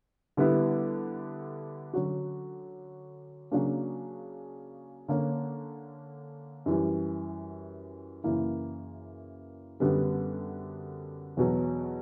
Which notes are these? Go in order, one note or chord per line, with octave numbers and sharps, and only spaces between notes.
D3 G3 B3 E4
D3 F#3 C#4 F#4
C#3 F#3 A#3 D4
D3 A#3 C#4
F#2 E3 G3
F#2 C#3 E3 A#3 E4
F#2 D3 G3 B3
E2 B2 F#3